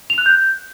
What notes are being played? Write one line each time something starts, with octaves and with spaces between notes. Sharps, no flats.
F7
F#6
G6